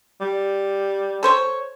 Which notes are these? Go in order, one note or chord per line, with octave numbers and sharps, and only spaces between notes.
G3
A4 C5 C#5